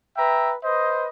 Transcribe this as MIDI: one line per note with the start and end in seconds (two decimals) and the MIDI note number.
0.17 0.53 71
0.17 0.53 76
0.17 0.53 79
0.17 0.53 82
0.63 1.07 71
0.63 1.07 72
0.63 1.07 75